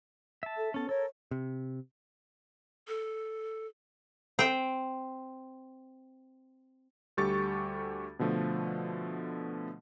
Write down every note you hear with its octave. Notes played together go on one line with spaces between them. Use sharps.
E5 A5
A4
B3 C#4 A4
A4 A#4 C#5
C3
A4
C4 G5
D2 G3 G4 A4 C#6 A6
B2 D3 F3 A3